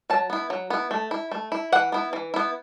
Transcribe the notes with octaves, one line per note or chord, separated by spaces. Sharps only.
F#3 A5
B3 E4
F#3
B3 E4
A3
E4
A3
E4
E3 F#5
B3 E4
E3
B3 E4